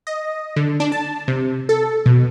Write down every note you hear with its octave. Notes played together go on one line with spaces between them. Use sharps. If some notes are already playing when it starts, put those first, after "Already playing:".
D#5
D3
D4
A5
C3
A4
B2